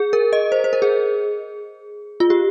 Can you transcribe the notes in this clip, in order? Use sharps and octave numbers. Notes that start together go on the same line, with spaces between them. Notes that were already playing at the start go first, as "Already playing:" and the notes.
Already playing: G#4
A#4
D#5
C5
C5
A#4
G#4
F4
G4